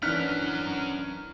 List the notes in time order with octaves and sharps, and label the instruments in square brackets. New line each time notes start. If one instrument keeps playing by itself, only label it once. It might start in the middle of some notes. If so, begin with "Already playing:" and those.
[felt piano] E3 D4 [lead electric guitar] C#4 A#4 [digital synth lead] F6 [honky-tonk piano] F#6 B6